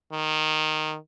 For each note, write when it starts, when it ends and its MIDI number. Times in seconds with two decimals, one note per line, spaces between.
0.13 0.96 51